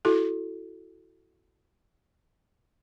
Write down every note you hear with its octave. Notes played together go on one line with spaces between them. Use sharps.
E4 F#4 A4